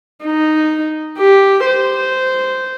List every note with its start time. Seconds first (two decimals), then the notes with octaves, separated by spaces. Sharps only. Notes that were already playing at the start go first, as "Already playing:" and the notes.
0.25 D#4
1.18 G4
1.66 C5